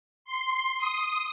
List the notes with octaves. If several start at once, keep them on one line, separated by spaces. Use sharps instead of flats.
C6
D#6